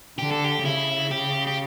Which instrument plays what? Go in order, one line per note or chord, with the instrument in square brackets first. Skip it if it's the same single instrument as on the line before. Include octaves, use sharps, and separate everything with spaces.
[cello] D3 [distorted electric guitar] G4
[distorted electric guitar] A4
G4
[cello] C#3 [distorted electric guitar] E4
[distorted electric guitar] G4
G4